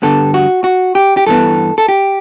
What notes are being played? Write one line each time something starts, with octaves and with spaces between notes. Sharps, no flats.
G2 D3 G3 B3 A4
F#4
F#4
G4
G4
G2 E3 B3 A4
A4
G4